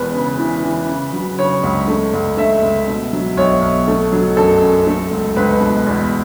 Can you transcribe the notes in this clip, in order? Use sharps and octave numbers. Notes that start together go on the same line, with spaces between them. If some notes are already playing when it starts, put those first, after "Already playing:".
Already playing: E1 E2 B4
C#3
E3
E3
C#3
F#3
C#3 C#5
C#2
A3
C#2
A3 E5
C#2
B2
F#3
B1 C#5
B1
A3
F#3
F#2 A4
F#2
A3
C#2
C#2 B4
B2
E2